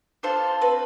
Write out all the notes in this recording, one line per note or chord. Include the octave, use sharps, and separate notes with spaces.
D4 F4 A4 C5
C4 B4